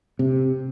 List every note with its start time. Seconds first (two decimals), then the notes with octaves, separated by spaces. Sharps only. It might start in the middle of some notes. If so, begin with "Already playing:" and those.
0.19 C3